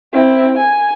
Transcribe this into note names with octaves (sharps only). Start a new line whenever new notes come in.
C4 E4
G#5